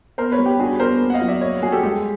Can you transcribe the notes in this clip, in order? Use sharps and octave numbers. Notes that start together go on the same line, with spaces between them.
B3 A#4 C5
B4 C#5
G3
G4
D4 F#4 G#4
B3 A#4 C5
A#3
F#5
D#5 F5
F#3
D5 E5
A#3 C#5 D#5
G3 F#4 G#4
G4 A4
G#3 G4